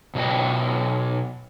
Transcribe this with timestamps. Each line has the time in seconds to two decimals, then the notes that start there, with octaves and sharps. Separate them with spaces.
0.15 B2 F#3 D#5 G5